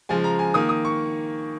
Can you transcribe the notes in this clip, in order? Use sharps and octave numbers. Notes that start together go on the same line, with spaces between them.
C#3 F3 G#3 G#5
A#5
G#5
D#3 A#3 D#6
D#6
C#6